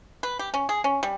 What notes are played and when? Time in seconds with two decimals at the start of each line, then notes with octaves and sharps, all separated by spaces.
0.23 B4
0.39 G4
0.54 C#4
0.69 G#4
0.84 C#4
1.03 G3